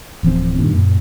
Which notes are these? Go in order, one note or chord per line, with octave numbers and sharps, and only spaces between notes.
D1 E3 F3 C4
G2 A#2 D#3
F#2 A#2